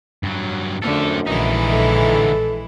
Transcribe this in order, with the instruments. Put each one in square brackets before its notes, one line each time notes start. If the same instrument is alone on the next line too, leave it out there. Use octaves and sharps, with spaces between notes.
[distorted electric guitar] G2 F#3
[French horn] F#2 [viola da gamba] D3 A3 [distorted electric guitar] F3 A4
[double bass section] A#1 [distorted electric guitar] D3 D#4 [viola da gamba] E3 G#3 E4
[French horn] A4